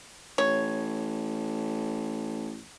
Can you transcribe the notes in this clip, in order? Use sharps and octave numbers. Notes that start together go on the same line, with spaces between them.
A1 C#5